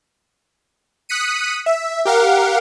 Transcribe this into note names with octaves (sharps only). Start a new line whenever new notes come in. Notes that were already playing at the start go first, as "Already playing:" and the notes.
D#6 F#6 B6 C#7 D#7
E5
G4 A#4 F5 F#5